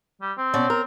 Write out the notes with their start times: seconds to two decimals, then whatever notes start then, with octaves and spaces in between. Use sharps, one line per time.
0.22 G3
0.38 C4
0.54 B2 C#4 D5
0.70 A#4